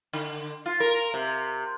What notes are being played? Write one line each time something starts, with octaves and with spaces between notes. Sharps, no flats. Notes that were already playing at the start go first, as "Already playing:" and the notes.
D3
F4
A#4
C3